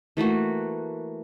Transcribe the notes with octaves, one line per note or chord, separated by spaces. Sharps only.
E3 A3 A#3 F#4